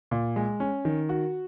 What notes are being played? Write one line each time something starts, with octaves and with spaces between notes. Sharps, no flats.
A#2
G#3
C#4
D#3
F#4